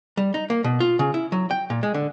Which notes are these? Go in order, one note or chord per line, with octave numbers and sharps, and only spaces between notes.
G3
D#4
A#3
B2
F4
C#3
E4
F#3
G5
A#2
G#3
D3